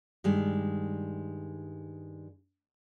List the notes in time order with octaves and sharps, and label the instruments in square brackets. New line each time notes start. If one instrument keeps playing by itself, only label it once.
[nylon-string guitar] G2 D#3 G3 G#3